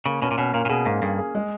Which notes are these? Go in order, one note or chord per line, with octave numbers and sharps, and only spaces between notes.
C#3 A#3
B2 C#4
A#2
B2 C#4
A#2 A#3
A#2
B2 G#4
G#2 A#3
G2 G#4
G#4
G#3